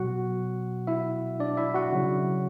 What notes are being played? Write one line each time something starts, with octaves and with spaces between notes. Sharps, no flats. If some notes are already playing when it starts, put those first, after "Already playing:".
Already playing: B2 F#3 F#4 F#5
E4 E5
D4 D5
E4 E5
F#4 F#5
C#3 F#3